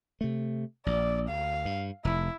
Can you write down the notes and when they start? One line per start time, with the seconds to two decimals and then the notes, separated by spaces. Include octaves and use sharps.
0.21 C3 A3
0.86 A#1 D5
1.28 D2 F5
1.65 G2
2.05 F1 E4